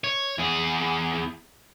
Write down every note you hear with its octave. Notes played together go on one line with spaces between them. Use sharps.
C#5
E2 G#4